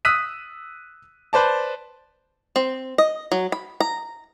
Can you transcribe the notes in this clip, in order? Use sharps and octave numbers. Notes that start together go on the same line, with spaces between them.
D#6 E6 F#6 B6 D#7
B4 C5 D5 A5
C4
D#5
F#3
B5
A#5